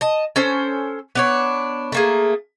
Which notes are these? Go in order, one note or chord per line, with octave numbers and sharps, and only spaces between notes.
D#5 A5
C#4 A4 C5
B3 D4 C#5
A3 A#3 G#4